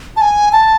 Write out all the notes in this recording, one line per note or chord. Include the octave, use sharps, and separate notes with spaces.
A5
G#5
A5